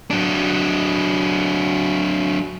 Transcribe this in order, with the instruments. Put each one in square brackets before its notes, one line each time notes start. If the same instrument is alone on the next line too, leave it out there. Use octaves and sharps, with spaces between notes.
[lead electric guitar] F#3 D4